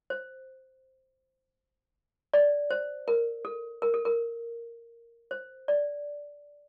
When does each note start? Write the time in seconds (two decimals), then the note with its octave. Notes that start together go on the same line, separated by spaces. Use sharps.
0.10 C5
2.34 D5
2.71 C5
3.08 A#4
3.45 A4
3.82 A#4
3.94 A4
4.05 A#4
5.31 C5
5.68 D5